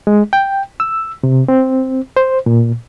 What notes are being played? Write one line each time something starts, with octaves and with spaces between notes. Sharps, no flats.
G#3
G5
E6
C3
C4
C5
A#2